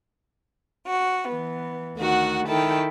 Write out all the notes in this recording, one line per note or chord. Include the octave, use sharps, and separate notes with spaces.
F#4
E3 B3
D2 D#3 F#4 F#5
D#3 E4 A4 G5